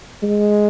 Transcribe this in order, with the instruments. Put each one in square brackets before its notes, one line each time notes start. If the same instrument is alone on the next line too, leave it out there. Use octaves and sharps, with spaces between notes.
[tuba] G#3